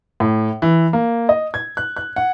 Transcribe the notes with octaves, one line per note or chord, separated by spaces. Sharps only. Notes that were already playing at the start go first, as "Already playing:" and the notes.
A2
E3
A#3
D#5
G#6
F#6
F#6
F#5